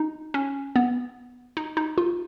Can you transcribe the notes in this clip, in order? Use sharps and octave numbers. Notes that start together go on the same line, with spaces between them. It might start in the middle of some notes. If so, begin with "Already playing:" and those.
Already playing: D#4
C#4
B3
D#4
D#4
F4